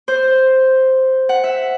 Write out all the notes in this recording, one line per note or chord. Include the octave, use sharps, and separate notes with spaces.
C5
F#5
E5